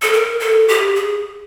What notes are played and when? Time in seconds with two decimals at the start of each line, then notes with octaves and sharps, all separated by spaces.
0.02 A4
0.13 A#4
0.40 A4
0.68 G4
0.95 G#4